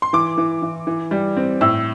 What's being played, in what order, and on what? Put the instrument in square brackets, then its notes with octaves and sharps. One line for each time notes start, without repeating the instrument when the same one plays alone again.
[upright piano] C6
E3 D6
E3
E3
E3
G3
C4
A2 E6